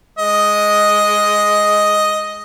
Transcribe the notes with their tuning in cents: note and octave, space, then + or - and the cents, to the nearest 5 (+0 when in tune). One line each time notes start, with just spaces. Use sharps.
G#3 +5 D#5 +5